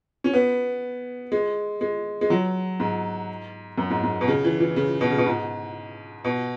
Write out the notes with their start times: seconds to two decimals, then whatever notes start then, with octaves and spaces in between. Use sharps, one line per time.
0.24 C#4
0.33 B3
1.32 G#3
1.81 G#3
2.21 G#3
2.30 F#3
2.80 G#2
3.78 F#2
3.90 G#2
4.03 G#2
4.21 B2
4.28 C#3
4.44 E3
4.60 E3
4.76 C#3
5.01 B2
5.11 C#3
5.18 B2
5.26 G#2
6.25 B2